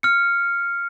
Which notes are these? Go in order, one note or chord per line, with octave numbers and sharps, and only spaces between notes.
F6 C#7